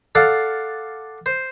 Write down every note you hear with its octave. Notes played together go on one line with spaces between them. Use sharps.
A4 D5 F5 F#5
C5